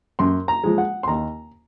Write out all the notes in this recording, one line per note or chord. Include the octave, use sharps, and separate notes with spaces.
F#2 C6
A#5
F3 G#3
F#5
C6
D#2 A#5